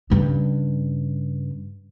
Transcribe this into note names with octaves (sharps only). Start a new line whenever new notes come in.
G2 C#3